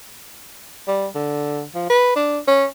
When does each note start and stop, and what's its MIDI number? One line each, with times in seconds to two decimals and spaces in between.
0.88 1.07 55
1.15 1.63 50
1.75 1.88 53
1.89 2.15 71
2.16 2.38 62
2.47 2.65 61